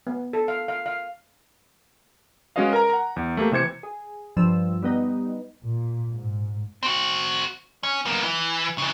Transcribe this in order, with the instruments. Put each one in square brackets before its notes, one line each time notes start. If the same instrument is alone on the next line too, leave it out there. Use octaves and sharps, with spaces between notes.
[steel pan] B3
A4
F5
F5
F5
[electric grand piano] G#3 C#4 F#4 B4 D#5 F5
A#4 A#5
F#5 A#5
E2
A3 A#3 G4
C3 E3 C5 G#6 C#7
[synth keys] G#4
G2 F3 E6
G3 B3 D#4
[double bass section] A#2
G#2
[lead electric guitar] C4 F#4
C#4
A#3 B3
E3
C#3 E3